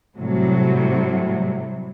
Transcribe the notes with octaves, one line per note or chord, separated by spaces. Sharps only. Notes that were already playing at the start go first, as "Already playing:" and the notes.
A2 C3 F#3 G3